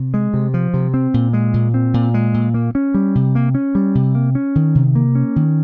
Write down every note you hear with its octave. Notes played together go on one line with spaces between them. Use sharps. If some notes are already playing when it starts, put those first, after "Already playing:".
Already playing: C3
G#3
C3
F3
C3
C4
A#2
G#3
A#2
C4
A#2
G#3
A#2
A#3
C#4
G3
C3
A#3
C#4
G3
C3
A#3
C#4
D#3
C3
A#3
C#4
D#3